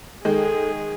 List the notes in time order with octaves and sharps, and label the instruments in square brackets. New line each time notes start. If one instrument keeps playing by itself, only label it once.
[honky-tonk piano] D#3 G#3 [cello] G#4 [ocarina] A4